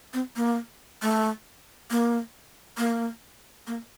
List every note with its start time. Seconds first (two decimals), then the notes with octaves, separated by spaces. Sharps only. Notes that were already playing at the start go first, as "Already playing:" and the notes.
0.14 C4
0.36 A#3
1.02 A3
1.91 A#3
2.78 A#3
3.67 A#3